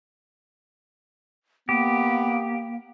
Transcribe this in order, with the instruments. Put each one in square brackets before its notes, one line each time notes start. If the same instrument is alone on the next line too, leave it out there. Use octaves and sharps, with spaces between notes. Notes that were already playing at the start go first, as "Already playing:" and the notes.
[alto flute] A#3 [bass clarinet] B3 [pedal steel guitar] G4